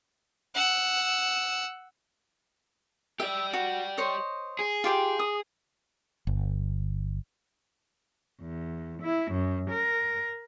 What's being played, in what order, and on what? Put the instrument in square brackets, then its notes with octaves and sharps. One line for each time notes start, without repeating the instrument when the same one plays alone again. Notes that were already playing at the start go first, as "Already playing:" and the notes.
[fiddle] F#5 E6
[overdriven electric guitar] G4 D5 [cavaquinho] E5
[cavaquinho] F#4
C5 C#5 D#5
[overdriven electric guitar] G#4
[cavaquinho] F4 G4 G5
D#6
[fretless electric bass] G1
[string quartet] E2
E4
F#2
A#4